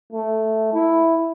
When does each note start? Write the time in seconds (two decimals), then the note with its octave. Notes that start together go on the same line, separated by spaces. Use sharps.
0.12 A3
0.73 E4